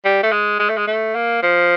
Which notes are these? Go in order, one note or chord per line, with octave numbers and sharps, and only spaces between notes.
G3
A3
G#3
G#3
A3
G#3
A3
A#3
F3